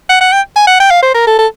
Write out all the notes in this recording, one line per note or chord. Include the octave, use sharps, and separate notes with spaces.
F#5
F#5
G5
G#5
F#5
G5
F5
C5
A#4
A4
A4